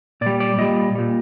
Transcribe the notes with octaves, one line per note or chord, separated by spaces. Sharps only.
A#2 G3 D5
D5
A#2 G3 D#5
A#2 G3